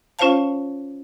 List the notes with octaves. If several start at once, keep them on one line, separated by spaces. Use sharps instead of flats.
C#4 F4 C5 C#5 F5 A5